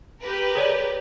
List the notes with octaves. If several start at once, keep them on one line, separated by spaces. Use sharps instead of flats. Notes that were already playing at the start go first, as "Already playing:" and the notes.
G4 A#4 B4
G#4 C#5 D5